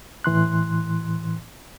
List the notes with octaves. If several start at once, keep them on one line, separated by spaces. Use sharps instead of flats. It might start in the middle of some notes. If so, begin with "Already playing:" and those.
A2 E3 C6 F#6